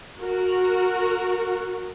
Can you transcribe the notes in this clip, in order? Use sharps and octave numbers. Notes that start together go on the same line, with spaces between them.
F#4 A#4